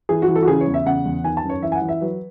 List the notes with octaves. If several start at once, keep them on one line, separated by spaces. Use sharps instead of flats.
E3 G#4
F#4
E3
A4
F#4
C#3 G#4
C#5
E2
E5
C#3 F#5
E2
D#3 G#5
A5
F#2
C#5
E3 E5
G#5
F#5
E3
E5
F#3 B4